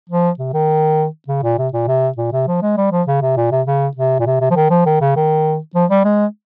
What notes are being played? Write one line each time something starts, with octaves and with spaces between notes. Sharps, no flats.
F3
C3
D#3
C#3
A#2
C3
A#2
C3
A#2
C3
F3
G#3
G3
F3
C#3
C3
A#2
C3
C#3
C3
A#2
C3
C3
F3
D#3
F3
D#3
C#3
D#3
F3
G3
G#3